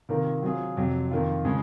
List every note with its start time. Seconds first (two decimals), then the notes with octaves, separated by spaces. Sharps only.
0.09 C3 D#3 A#3 F4 A#4
0.42 F#3 C4 F4 G#4
0.77 F2 C3 F#3
1.11 F2 D#3 A#3 F4
1.45 C#3 F3 G#3 C#4 G#4